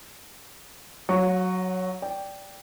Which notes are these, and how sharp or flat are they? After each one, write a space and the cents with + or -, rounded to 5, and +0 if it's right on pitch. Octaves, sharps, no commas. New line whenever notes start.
F#3 +0 F#4 -40 C#6 +0
D5 -15 G5 +0